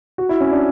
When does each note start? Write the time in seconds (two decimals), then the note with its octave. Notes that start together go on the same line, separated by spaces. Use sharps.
0.18 F#4
0.29 E4
0.40 C#4
0.52 D4